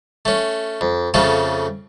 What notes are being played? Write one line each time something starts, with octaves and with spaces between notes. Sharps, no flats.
A3 C#4
F2
F2 C#3 A3 C#4 F4